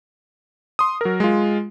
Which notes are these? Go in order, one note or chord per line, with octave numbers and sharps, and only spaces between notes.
C6 D#6
F#3 A#4
G#3 F4